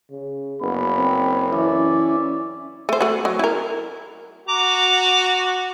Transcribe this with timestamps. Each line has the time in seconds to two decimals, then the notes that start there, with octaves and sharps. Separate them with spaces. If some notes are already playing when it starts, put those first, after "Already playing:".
0.11 C#3
0.62 F#1 B3 B5
0.97 C4
1.53 E3 C#4 E4 D5
2.89 A3 C5
3.01 A3 F#4
3.25 F#3
3.39 E4 A#4
4.48 F#4 A#5 D6